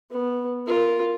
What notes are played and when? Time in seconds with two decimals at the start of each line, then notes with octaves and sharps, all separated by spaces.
0.11 B3
0.67 F4 A#4